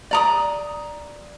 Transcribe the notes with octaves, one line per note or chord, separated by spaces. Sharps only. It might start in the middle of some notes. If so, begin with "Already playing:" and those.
D5 A#5 D#6